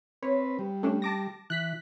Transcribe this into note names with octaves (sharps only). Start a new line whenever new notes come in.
C4 B4 C#5
G3
A3 C#4 D4
A5 D6 A#6
E3 F#6 B6